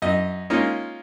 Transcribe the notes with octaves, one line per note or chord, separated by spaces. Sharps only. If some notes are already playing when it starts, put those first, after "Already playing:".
F#2 D#5
G#3 A#3 C#4 D#4 F4